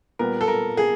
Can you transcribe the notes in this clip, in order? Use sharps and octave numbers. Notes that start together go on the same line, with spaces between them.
A#2 G3 B3 A#4
A4
A#4
G#4